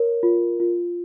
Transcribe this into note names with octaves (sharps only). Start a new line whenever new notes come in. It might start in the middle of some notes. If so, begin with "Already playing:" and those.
Already playing: A#4 C#5
F4
F4